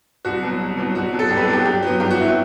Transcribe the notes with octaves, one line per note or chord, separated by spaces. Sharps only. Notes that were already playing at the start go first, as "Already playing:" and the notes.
C2 F#4
B2 F#3
C2
B2 F#3
C2 F#4
B2 F#3
A4
C2 G4
B4
A4
B2 F#3
G4
G2 G4
F#3 B3
G2 G4
F#4
F#3 B3 E4
F#4